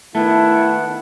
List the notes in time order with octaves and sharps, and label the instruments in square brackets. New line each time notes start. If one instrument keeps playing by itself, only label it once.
[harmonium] D#3 B3 F#5 [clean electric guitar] A3 [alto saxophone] E4 [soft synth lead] A5